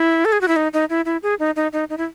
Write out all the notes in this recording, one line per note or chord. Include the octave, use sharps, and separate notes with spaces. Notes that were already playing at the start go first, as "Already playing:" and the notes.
Already playing: E4
A4
G#4
F#4
E4
D#4
D#4
E4
E4
G#4
D#4
D#4
D#4
D#4
E4